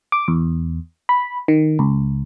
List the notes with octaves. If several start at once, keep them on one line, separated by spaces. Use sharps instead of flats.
D6
E2
B5
D#3
C#2